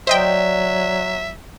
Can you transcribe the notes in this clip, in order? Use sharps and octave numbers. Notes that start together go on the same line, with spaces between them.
F#3 D4 A#4 C5 D#5 E5 G5